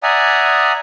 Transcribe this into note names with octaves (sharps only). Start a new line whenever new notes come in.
D5 E5 F#5 G#5 A#5 D#6